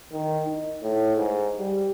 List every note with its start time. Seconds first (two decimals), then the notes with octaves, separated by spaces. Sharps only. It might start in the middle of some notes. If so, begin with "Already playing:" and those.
0.12 D#3
0.45 D#4
0.83 A2
1.16 G#2
1.58 G3